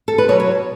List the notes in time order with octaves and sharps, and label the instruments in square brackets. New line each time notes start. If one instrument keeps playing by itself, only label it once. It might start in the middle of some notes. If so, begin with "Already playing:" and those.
[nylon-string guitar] A4
B4
B2 F#3 C#5
C#5